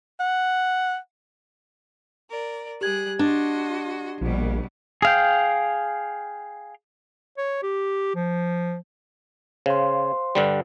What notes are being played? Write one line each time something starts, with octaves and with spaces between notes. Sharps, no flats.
F#5
A#4 D5
G3 G4 G#4 F#6 G#6
D4 F#4 D#5 C6
A#1 B2 G3
G#4 F5 G5
C#5
G4
F3
C#3 C5 F5 C6
G2 D3 G3